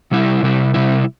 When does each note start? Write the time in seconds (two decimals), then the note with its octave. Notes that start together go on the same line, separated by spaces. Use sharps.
0.11 C3 G3 E4
0.43 C3 G3 E4
0.74 C3 G3 E4